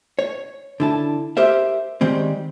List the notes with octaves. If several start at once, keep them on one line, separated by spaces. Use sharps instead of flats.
C#5
D3 E4 A5
G4 A#4 C5 E5
D#3 G3 G#3 C4